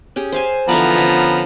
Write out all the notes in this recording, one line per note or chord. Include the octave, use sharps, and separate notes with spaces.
C#4 G4 G#4
C5 F5 G#5
D3 E3 F3 B3 D5 A#5
D3 C#4